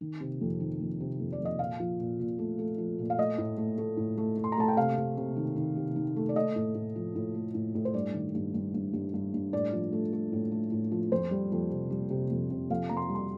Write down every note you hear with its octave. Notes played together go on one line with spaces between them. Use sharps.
D#3
C3
F2
D#3
F2
C3
F2
D5
F2 D#5
A#2 F5
F3
A#2
A#2
A3
A3
F3
A#2
F5
A3 D#5
A2
A3
A3
A2
A3
A3
C6
A#5
A3 A5
G5
C3 F5
C3
C3
D#3
D#3
C3
D#3
A3
D5
A3 D#5
A2
A2
F3
A2
A3
A2
A2
C5
G2 D5
D#3
G2
G2
G2
G2
G2
G2
A2 D5
F3
A3
A3
A2
A3
A2
F3
F2 C5
G3
F2
C3
G3
C3
F2
C3
F2 F5
F2 A#5
C6
G3
C6